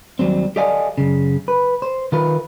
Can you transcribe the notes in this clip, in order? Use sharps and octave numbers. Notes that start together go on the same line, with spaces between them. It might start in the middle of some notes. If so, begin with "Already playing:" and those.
D#2 F#3 G3 C4
G4 A4 D5 D#5 F5 G#5
F#2 C#3
B4
C5
D#3 F4 A#4 B4